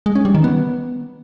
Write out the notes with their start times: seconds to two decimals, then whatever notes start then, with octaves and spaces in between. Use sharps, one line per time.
0.06 G#3
0.15 C#4
0.25 G3
0.35 D#3
0.44 B3